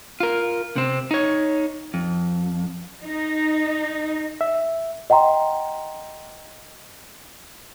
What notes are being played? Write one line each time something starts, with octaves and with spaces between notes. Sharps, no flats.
F4 A#4
C3 C4
D#4 C#5
F2
D#4
E5
D#5 F#5 G5 A#5 C6